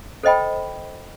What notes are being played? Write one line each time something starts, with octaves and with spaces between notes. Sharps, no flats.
A4 C5 D#5 G5 B5